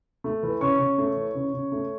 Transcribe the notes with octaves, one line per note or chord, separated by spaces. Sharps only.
A3
E3
C#3 C#5 C#6
C#3
A3
E3
C#3
C#3
A3